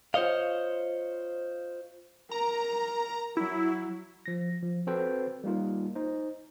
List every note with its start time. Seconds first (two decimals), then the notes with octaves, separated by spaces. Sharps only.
0.14 F4 C5 C#5 D#5 F5
2.31 A#4 A#5
3.37 F#3 E4
4.26 F3 A#6
4.63 F3
4.87 C4 F#4 A4 B4 C5 G5
5.44 G3 A#3 D#4 F4
5.96 D#4 C5